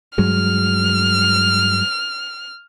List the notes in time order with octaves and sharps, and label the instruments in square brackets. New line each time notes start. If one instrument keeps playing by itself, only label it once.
[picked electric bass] G2 F#3 G#3 [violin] F6